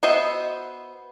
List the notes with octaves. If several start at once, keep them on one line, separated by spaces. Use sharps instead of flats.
B3 F#4 C5 D#5 E5